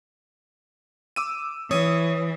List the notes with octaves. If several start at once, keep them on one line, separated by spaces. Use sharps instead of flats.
D6 E6 D#7
E3 C#5 D#6 D#7